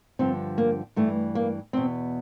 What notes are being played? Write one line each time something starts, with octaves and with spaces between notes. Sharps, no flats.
G2 D3 F3 C4
A#3
G2 E3 A3
A#3
E2 B2 C4